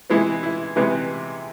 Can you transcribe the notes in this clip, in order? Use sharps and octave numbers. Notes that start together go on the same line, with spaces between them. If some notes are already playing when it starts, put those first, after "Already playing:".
C3 E3 G#3 B3 E4
E4
C3 E3 G#3 B3